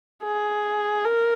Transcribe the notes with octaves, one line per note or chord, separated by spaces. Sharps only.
G#4
A#4